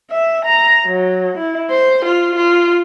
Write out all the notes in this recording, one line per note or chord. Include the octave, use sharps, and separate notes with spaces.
E5
A#5
F#3
E4
C5
F4
F4